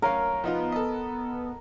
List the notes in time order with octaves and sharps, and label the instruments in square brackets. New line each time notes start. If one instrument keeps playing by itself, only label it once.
[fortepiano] F#2 C#4 F5 [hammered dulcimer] A#4
[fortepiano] F3 D#4 F4 [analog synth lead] B3
[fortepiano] A4 D#5